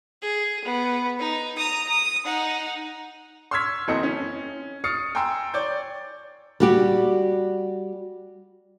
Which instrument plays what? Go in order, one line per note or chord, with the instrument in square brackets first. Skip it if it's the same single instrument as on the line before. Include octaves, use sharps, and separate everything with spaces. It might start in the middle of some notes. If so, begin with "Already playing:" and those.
[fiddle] G#4
B3
D#4
A#5 D#6
D#6
D#4 F#5
[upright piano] C6 C#6 E6 F6 G#6 B6
F#1 E2 C4 A4 D#5 C#7
C#4
C#6 D#6 F6 A6 C7 C#7
G5 G#5 A#5 C6 E6
C#5 D5 G6
[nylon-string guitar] G3 F#4 G4